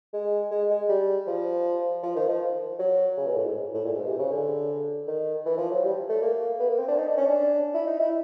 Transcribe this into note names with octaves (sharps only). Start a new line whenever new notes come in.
G#3
G#3
G#3
G3
F3
F3
D#3
F3
F#3
C#3
B2
A2
G#2
A2
A#2
G#2
C3
C#3
D3
D#3
E3
F3
F#3
G3
A3
A#3
B3
A#3
C4
D4
D#4
D4
C#4
D4
E4
D#4
E4